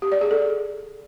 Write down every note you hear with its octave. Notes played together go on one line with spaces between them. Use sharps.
G4
D5
G#4
A4